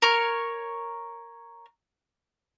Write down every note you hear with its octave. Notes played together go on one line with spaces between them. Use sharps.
A#4 C#5